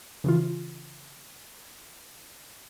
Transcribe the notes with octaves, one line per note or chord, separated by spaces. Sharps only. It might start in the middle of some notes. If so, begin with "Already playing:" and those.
C#3 E3 F4